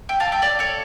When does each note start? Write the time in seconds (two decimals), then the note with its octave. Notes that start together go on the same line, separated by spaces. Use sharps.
0.09 E5 G5
0.20 F5 A5
0.32 E5 G5
0.42 D5 F5
0.59 A4 C#5